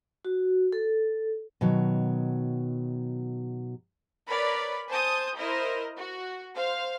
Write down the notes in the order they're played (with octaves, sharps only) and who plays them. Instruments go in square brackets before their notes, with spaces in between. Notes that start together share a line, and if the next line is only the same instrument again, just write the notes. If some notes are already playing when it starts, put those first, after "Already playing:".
[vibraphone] F#4
A4
[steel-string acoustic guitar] B2 D#3 F#3
[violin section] A#4 B4 C#5 D5 B5
C5 G#5 A5 D#6 G6
E4 A#4 C5 D#5
F#4
C5 F5